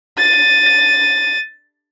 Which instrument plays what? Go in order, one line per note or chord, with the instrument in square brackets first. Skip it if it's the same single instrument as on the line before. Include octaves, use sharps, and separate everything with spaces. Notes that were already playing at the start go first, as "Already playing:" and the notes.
[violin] A6 D#7